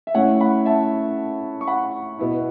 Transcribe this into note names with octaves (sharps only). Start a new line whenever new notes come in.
E5
A2 A3 C#4 E4 C#5 F#5
F#5 B5
E5 A5
C#6
F#5 B5
B2 B3 E4